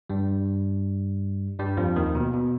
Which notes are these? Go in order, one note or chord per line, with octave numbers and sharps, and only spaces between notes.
G2 G3
G2 G3
F2 F3
D#2 D#3
B2
B2